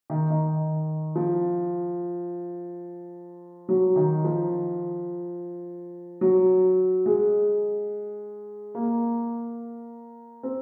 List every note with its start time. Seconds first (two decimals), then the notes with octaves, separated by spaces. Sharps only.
0.10 D#3
0.30 D#3
1.15 F3
3.69 F#3
3.96 D#3
4.24 F3
6.21 F#3
7.06 G#3
8.75 A#3
10.43 C4